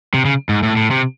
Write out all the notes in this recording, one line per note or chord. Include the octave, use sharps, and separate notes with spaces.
C3
C#3
G#2
A2
A2
C3